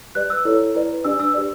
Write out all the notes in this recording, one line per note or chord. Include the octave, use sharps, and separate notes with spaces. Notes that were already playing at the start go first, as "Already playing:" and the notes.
G4 B4 D5 F#6
E6
E4 A4 C#5
E4 B4 D5
D4 G4 B4 D5 E6
E6
G4 B4 D5